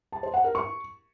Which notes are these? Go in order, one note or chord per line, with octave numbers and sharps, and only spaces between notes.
A5
C5
F#5
A#4
C#6